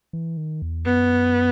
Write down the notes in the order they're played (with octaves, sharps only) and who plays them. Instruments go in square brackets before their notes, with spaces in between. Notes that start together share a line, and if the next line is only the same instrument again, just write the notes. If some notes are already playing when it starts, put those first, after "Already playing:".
[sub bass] E3
D#3
E2
[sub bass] F#2 [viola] B3